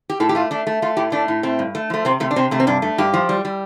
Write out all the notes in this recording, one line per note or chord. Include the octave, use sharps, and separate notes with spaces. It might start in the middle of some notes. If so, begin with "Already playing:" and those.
G4
A2 A4
G4
A3 F4
A3 D4
A3
A3 F4
A2 G4
A3 D4
A2
A3 C4
G2
A3
F3 A3
C3 C4
C3 A3
D4
C3 C4
C3 A3
C4
G2 D4
A3
G2 G4
F3
G3
G3